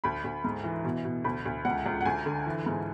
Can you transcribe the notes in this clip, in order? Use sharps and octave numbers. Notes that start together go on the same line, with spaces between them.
D2 B5
D2
G#2
E3
B2
B2
D2 B5
D2
C#2 F#5
C#2
F#5
D2 G#5
D3
E3
G#2